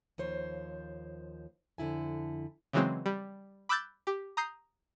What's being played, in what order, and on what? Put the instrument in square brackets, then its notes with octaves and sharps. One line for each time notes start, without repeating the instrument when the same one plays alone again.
[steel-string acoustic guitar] D#2 F3 C5 C#5
F2 D3 E4 G#5
[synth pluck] C#3 E3 F#3 G#3 C4
G3
B5 D6 E6 F#6 G6 A6
G4
A#5 D#6 G6 C7